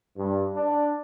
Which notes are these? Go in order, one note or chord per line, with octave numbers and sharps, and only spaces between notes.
G2
D4